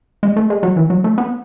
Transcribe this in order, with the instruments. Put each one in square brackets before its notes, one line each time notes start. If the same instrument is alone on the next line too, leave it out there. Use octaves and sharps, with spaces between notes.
[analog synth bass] G#3
A3
G#3
F#3
E3
F#3
A3
B3